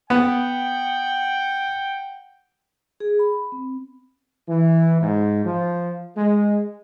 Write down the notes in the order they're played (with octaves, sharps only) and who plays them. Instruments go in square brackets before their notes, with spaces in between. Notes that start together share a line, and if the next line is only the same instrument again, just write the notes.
[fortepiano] B3 [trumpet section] F#5 G5
[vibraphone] G#4
B5
C4
[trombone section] E3
G#2
F3
G#3